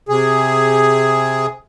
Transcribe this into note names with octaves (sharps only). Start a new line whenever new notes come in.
C3 G#4